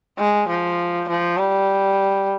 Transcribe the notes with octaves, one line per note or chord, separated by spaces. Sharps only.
G#3
F3
F3
G3